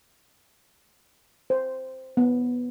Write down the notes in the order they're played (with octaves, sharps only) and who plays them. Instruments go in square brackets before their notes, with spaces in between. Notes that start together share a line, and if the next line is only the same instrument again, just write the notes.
[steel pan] C5
B3